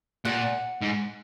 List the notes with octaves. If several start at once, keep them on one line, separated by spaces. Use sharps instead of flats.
A#2 F#5
G#2